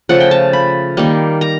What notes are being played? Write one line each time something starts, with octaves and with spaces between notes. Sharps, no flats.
C#3 F3 A3 F#5
G5
A5
B5
D#3 G3 A#3
A#5